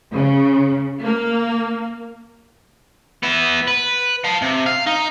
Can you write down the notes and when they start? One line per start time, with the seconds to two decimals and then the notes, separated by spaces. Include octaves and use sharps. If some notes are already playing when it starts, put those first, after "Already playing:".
0.13 C#3
1.03 A#3
3.23 B3 E4
3.68 B4
4.24 F5 A5
4.42 C3
4.66 F5
4.87 D#4